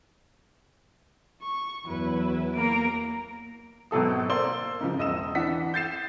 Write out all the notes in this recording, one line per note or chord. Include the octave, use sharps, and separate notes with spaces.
C#6
E2 F#3 E4 B4
A#3 A#5 D7
G#1 B2 F#3 A4 D#6
A#3 C5 D5 C6 E6 G7
G#2 C#3 F3
E1 D#5 D#6 E6 E7
E3 D4 F#5 B6
G6 A6 C7 E7